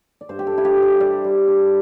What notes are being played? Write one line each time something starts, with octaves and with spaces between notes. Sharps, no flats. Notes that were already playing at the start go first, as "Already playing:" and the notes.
D5
G2 C5
G4
A4
G2 E4
G4
G2
C5
G3 D5
G3
D4